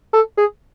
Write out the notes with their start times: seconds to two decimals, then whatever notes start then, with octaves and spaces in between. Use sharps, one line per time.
0.13 A4
0.37 G#4